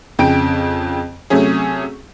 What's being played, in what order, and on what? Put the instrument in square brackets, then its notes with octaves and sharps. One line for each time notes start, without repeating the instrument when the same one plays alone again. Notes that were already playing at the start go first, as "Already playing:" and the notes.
[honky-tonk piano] F2 C#3 G5 D7
C3 F#3 A3 C#4 G#4